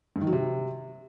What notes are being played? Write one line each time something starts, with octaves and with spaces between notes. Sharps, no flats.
G2
D#3
F#3
C3